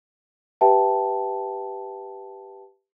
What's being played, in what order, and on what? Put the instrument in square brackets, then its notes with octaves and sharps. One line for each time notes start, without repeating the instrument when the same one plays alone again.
[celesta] G4 B4 E5 G5 A5